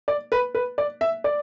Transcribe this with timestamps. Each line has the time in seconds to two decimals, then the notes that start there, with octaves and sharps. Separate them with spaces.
0.08 D5
0.32 B4
0.55 B4
0.78 D5
1.01 E5
1.24 D5